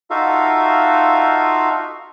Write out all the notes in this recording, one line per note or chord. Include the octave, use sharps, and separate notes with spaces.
D#4 F4 F#4 A4 E5 F5